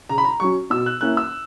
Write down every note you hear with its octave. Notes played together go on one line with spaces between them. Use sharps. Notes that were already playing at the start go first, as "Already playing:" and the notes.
C#3 A#5
B5
A#5
F#3 C#4 C#6
B2 E6
F#6
A#3 C#4 E4 F#6
E6